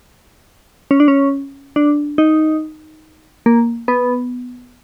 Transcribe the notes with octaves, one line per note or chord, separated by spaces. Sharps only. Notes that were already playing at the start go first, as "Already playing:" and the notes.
C#4
D4
C#4
D4
D#4
A#3
B3